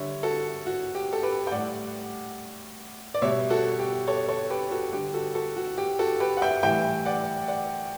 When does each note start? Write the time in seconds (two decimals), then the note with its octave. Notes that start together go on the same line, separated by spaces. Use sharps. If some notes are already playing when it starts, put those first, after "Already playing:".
Already playing: D3 G3 C#5 E5
0.23 F#4 A4
0.66 F#4
0.95 G4
1.13 A4
1.23 G4 B4
1.47 G5
1.51 A2 G3 D5 F#5
3.14 D5
3.22 B2 G3 C#5 E5
3.50 F#4 A4
3.79 G4
4.07 A4 C#5
4.28 A4 C#5
4.50 G4 B4
4.71 F#4 A4
4.92 D3 G3 G4
5.14 F#4 A4
5.35 F#4 A4
5.56 F#4
5.78 G4
5.99 F#4 A4
6.20 G4 B4
6.37 F#5
6.42 E5 G5
6.63 A2 E3 G3 E5 G5
7.06 D5 F#5
7.48 D5 F#5